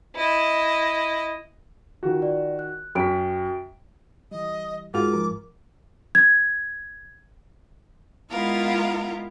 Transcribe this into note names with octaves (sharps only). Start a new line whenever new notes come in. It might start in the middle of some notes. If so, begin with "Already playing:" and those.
E4 D#5
D#3 F4 F#4
D5
F#6
F#2 F#4 G5 B6 D7
E3 G3 D#5
G#2 F4 F#4 G#4 A#4 D6
F3 A#4
G#6
G#3 B3 E4 F4 A#4 F5